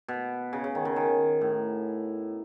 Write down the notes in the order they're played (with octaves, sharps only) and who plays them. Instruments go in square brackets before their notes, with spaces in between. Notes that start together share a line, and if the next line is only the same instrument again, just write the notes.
[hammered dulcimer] B2
C#3
C#3
D#3
C#3
D#3
A2